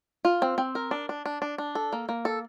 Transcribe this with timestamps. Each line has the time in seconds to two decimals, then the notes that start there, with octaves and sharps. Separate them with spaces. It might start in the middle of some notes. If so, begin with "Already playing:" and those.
0.25 F4
0.42 C4
0.58 C4
0.75 A#4
0.91 D4
1.09 D4
1.26 D4
1.42 D4
1.58 D4
1.75 A4
1.93 A#3
2.09 A#3
2.25 A4